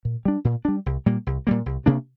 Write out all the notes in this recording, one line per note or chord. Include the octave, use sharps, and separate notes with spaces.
A#2
G3 D4
A#2
G3 D4
C2
A#2 G3 A#3
C2
A#2 G3 A#3
C2
C3 A#3 D4